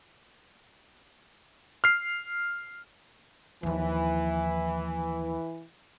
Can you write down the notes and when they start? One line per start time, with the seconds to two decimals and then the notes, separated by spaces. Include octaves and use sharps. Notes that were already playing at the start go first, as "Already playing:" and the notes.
1.84 F6 C7
3.63 D#2 E3 F3